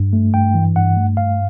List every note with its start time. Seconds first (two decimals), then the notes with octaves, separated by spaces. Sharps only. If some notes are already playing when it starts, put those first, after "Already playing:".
Already playing: G2
0.13 A3
0.34 G2 G5
0.55 E3
0.75 G2 F#5
0.97 A3
1.17 G2 F5